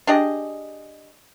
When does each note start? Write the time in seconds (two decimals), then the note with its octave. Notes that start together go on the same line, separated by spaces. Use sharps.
0.07 D4 G4 G#4 D#5